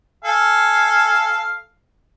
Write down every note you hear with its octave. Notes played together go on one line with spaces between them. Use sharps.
A4 F5 G#5